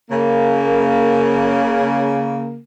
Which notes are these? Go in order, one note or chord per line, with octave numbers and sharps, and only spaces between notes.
C#3 A#3